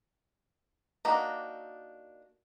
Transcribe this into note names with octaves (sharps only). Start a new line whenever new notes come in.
A#3 D4 D#4 F#4 G4